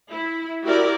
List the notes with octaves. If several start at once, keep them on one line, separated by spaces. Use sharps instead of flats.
E4
E4 F#4 G4 A#4 D5